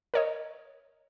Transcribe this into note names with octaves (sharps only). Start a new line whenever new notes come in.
A#4 C#5 D#5